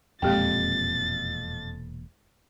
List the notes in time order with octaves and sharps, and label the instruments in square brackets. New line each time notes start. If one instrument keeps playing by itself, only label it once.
[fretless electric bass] E1 A#2 [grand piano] F2 [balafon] G#3 G4 G5 [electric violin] A6